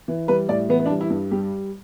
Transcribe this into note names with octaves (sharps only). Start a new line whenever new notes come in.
E3
G3 B4
A2 D5
E3 B3
B3
D4
G3
E4
G2
G3 G4